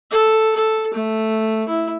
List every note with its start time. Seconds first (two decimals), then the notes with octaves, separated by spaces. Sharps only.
0.11 A4
0.55 A4
0.94 A3
1.68 E4